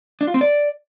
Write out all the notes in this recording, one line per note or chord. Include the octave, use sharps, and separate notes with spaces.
D4
F4
C4
D5